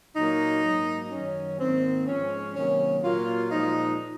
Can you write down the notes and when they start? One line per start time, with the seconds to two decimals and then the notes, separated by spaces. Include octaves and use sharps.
0.15 A#2 F#3 A#3 D#4
0.64 G#2 F#3 A#3
1.11 F#2 D#3 F#3 C#4
1.59 G#2 D#3 A#3 C4
2.07 G#2 F3 G#3 C#4
2.55 C3 D#3 F#3 A#3 C#4
3.03 A#2 F#3 A#3 F4
3.51 A#2 F3 G#3 D#4